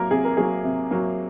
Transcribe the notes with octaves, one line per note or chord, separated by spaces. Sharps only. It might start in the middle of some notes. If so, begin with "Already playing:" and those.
Already playing: C3 F#3 A#3 A#4
C3 G#4
A#4
F#3 A#3 G#4
C3
F#3 A#3